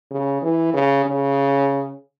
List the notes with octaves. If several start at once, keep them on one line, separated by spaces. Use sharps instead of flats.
C#3
E3
C#3
C#3